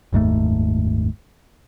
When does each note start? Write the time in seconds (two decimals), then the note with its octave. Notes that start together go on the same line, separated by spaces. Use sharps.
0.13 F#1 D#2 G#2 A3